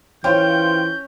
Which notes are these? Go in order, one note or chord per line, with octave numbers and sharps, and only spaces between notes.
E3 C#4 F4 C5 G5 G6